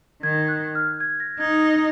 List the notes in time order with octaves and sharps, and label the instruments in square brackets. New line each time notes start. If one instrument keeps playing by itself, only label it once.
[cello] D#3 [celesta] G#6
[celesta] F#6
F6
G#6
A#6
[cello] D#4 [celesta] G#6
[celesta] A#6